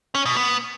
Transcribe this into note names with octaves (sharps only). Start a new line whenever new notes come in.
C#4
B2
B3